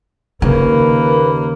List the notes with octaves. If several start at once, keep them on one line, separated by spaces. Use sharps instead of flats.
D#2 C#3 A#3 B4